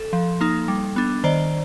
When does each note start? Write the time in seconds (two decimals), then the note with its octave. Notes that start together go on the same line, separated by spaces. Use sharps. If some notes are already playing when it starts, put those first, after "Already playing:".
Already playing: A4
0.13 F3
0.41 A#3 D#4
0.68 G3
0.96 B3 D4
1.24 D#3 C5 D5